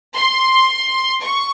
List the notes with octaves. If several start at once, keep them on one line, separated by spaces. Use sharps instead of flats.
C6
C#6